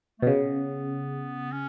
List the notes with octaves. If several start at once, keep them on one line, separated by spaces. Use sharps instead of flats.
A3
B2
C#3 B3
C#4